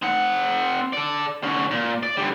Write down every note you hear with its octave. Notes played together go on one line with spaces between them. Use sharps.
C4 F#5
A4 D5
D3 C#4
A#2
D5
D3 G3